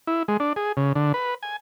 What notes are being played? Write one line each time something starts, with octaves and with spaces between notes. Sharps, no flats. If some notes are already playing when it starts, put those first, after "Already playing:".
E4
G#3
D4
G#4
C#3
D3
B4
G#5